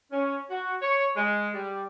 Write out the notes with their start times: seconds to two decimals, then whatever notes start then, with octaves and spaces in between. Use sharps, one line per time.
0.12 C#4
0.50 F#4
0.81 C#5
1.16 G#3
1.54 G3